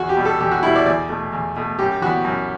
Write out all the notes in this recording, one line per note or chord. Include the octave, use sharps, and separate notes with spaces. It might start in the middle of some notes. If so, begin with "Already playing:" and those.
Already playing: E2 F#4
G4
B2 G3
A4
E2 G4
F#4
B2 G3 E4
D5
E2 D5
B2 A3
E2
B2 A3
F#2 G4
E3 G3 B3 F#4
F#2